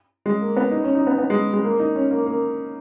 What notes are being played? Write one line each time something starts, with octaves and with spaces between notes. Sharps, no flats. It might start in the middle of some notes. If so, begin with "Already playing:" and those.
G#3
A#3
B3
D#4
C#4
D#4
B3
B3
G#3
G#3
A#3
D#4
C#4
A#3
A#3